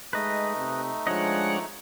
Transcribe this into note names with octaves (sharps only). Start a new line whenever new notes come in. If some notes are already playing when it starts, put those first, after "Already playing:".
G#3 A3 D#4 B4 D#5
C3
F3 G#3 D4 C#5 D#5 F#5